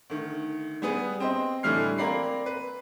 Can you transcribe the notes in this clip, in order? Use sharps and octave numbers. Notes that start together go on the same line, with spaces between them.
D2 D#3
G3 B3 G#4 B4
C4 C5 D#5
A2 D3 E3 G3 F6 C7
A#3 C4 D5 A#5 B5 C7
B4